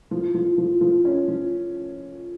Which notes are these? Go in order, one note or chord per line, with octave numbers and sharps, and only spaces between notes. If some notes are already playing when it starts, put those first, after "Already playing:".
F3
F3
F3
F3
C#4
F3